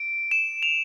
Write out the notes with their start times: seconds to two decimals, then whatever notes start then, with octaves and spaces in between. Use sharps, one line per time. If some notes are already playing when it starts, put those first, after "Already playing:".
Already playing: D7
0.31 E7
0.63 F7